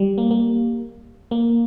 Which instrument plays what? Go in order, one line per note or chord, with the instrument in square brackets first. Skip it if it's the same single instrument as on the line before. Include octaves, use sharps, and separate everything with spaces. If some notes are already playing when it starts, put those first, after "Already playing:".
Already playing: [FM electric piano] G3
A#3
A#3
A#3